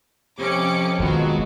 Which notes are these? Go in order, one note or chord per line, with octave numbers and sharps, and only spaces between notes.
F2 C3 C#4 D6 C#7
F1 B1 F2 D#3 F#3 G#3 B3 F#4